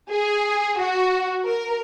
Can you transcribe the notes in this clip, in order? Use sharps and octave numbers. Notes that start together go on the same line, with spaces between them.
G#4
F#4
A#4